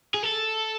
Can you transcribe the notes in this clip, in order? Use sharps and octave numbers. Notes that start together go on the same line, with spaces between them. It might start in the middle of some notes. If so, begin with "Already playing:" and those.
G#4
A4